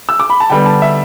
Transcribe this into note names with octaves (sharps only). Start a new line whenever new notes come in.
E6
D6
B5
A5
D3 G3 B3 G5
A5
E5